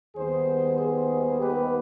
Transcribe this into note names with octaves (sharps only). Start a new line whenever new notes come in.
D#2 D#3 G3 B3 G#4 C5
G#4 C5
G4 B4